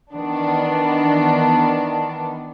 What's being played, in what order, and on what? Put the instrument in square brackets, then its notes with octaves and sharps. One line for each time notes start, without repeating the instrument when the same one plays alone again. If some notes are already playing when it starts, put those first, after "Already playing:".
[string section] D#3 E3 B3 D4